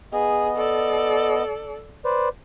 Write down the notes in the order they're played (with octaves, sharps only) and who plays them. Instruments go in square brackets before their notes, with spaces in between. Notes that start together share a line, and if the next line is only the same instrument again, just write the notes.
[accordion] B3 D#5 [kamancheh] G#4
[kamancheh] A4 D5
[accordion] B4 C5 D5